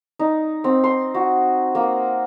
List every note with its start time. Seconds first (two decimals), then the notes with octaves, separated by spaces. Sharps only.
0.19 D#4
0.64 C4
0.84 C6
1.14 F#4
1.75 A#3